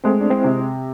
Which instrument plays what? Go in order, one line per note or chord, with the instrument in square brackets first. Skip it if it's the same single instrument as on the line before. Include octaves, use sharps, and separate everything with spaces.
[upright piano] G#3 [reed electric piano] A3 C4
[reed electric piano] D4
C4 E4
[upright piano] C3